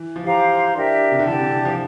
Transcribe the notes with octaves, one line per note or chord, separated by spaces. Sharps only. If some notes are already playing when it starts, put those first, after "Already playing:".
Already playing: E3
F3
E3 G4 C5 F5 A#5
D4 G4 A#4 E5
C3
D3
E3 G4 D5 A5
C3
D3
F3